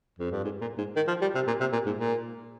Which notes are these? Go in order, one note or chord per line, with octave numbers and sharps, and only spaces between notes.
F2
G2
G#2
A#2
G#2
D#3
F3
G3
C3
A#2
C3
A#2
G#2
A#2